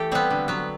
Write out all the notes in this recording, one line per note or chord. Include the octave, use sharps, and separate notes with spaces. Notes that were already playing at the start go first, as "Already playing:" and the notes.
Already playing: E3 A3 G4 A4
G3 B3 C4
D3
F#3 B3